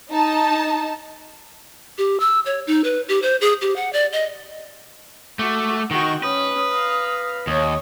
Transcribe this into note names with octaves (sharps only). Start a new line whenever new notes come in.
D#4 A5
G4
E6
C#5
D#4
B4
G4
C5
G#4
G4
F#5
D5
D#5
A3 F#4 D6
D#3 F#4 G5 C#6
C#4 B4 D#6
F5 A#5
D#2 C#5 D#6